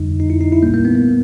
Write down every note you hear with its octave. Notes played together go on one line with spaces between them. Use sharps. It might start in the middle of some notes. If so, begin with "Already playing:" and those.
Already playing: F2 D3 G3 D#4
D#4
E4
D#4
E4
C2 A#2 G3 A#3
A#3
B3
A#3